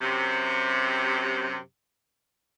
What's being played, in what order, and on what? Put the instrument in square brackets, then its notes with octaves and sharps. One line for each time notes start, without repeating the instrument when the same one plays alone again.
[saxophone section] F#2 C3